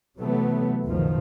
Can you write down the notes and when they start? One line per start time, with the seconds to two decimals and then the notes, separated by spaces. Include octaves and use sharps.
0.19 C3 E3 F#3 A3 B3
0.85 F#1 C#2 B2 D#3 F3